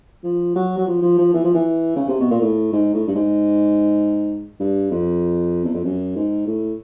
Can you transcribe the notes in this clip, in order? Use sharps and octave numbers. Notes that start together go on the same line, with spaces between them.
F3
F#3
F#3
F3
F3
F3
E3
F3
E3
C#3
C3
B2
A#2
A2
G#2
A2
G2
G#2
G2
F2
E2
F2
F#2
G#2
A2